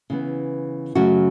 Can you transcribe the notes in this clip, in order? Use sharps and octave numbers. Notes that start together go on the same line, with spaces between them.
C#3 E3 B3
F#2 C#3 F#3 A3 C#4 F#4